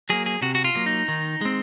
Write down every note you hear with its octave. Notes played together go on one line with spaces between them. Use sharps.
F#3 A#3 G#4
G#4
C3 F#4
F#4
F4
F#3 A#3
D#4
D#3
G#3 C4